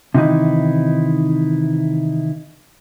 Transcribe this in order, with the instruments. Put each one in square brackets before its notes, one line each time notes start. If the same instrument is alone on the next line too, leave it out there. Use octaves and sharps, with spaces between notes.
[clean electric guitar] C3 D#3 E3 D#4 E4